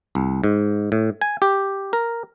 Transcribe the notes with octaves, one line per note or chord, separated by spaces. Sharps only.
C2
G#2
A2
G#5
G4
A#4